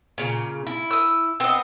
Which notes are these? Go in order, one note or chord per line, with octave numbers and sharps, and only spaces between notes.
A#2 C#3
E4
D#6 E6
B3 C4 D#5